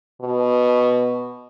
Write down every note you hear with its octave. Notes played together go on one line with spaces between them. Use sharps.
B2